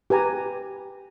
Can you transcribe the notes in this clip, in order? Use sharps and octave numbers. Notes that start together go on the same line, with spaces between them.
G4 B4 G#5 A#5